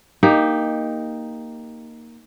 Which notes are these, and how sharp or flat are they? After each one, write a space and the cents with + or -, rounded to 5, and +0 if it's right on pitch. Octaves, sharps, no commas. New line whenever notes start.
A#3 +0 D#4 +0 G4 +15